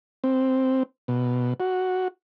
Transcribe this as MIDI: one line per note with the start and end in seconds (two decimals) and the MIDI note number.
0.24 0.83 60
1.08 1.54 47
1.60 2.08 66